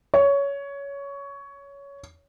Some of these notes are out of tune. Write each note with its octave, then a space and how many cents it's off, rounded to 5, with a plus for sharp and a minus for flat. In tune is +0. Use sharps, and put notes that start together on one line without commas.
C#5 +15